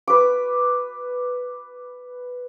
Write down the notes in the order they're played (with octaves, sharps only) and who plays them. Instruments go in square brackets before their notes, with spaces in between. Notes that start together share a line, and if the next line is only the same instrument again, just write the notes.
[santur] B4 D6